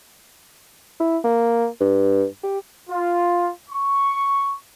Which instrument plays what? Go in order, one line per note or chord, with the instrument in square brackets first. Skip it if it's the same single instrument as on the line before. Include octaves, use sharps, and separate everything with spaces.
[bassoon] E4
A#3
G2
G4
[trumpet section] F4
C#6